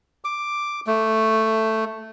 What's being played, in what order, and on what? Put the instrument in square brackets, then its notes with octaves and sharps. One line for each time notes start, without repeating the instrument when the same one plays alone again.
[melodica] D6
A3